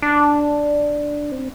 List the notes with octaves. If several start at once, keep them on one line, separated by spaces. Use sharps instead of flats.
D4
C4